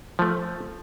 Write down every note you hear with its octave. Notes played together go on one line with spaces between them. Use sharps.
F3 A3